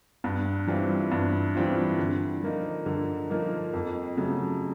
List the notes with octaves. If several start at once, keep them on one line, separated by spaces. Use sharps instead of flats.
G2
E3 G3 C4 F4
G2
E3 G3 C4 F4
D3
F3 A#3 D#4
D3
F3 A#3 D#4
F2
C#3 F#3 A3